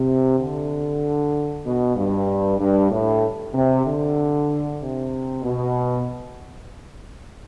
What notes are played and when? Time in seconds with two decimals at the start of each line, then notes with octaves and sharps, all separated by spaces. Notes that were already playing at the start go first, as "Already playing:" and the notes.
Already playing: C3
0.39 D3
1.64 B2
1.97 G2
2.59 G2
2.91 A2
3.54 C3
3.86 D3
4.80 C3
5.43 B2